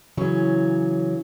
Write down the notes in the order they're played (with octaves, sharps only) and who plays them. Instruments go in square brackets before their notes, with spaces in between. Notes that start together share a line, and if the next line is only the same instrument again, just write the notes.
[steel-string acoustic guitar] C#3 E3 F#3 C#4